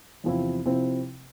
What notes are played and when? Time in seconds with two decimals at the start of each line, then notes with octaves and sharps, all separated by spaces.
0.24 E2 C3 F3 C4 E4
0.66 C3 F3 C4 E4